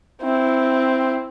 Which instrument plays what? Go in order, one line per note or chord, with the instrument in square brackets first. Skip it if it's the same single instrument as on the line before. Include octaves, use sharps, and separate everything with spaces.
[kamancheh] C4 E4